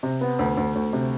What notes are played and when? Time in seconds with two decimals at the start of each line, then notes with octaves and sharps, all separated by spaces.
0.03 C3
0.21 B3
0.39 D2
0.57 D2
0.75 D2
0.93 C3